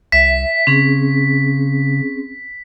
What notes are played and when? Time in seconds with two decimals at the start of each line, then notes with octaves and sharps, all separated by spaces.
0.12 C2 E5 B6
0.67 C#3 C4 C#4 G#4